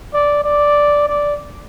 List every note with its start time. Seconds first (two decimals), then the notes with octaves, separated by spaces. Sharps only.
0.14 D5
0.44 D5
1.08 D5